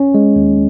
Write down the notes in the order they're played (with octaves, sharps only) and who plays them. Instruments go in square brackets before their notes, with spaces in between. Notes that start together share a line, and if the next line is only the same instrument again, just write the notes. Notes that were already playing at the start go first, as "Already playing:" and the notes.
Already playing: [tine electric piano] C#4
G#3
D#2